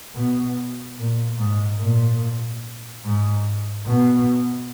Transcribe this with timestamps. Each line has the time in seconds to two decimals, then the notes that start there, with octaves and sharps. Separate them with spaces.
0.15 B2
0.98 A#2
1.38 G#2
1.79 A#2
3.04 G#2
3.85 B2